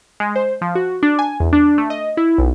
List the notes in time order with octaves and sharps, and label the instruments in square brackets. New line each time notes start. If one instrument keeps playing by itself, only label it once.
[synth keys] G#3
C5
F3
F#4
D4
G#5
E2
D4
A3
D#5
E4
B1